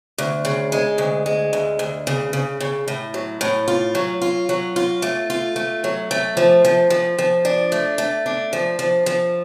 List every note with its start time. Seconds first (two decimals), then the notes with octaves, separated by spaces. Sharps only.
0.18 D2
0.45 C#3
0.72 G#3
0.98 D2
1.26 G#3
1.53 D2
1.79 D2
2.07 C#3
2.33 C#3
2.60 C#3
2.88 A2
3.14 F#3
3.41 A2
3.68 F4
3.95 F#3
4.22 F4
4.49 F#3
4.76 F4
5.02 A3
5.30 F4
5.56 A3
5.84 F#3
6.11 A3
6.37 F3
6.65 F3
6.90 F3
7.19 F3
7.45 D4
7.72 A3
7.98 A3
8.26 D4
8.53 F3
8.79 F3
9.06 F3